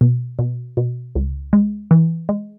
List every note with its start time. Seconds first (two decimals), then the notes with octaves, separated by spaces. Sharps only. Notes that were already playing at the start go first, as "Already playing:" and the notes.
0.01 B2
0.39 B2
0.77 B2
1.15 C#2
1.53 G#3
1.91 E3
2.29 G#3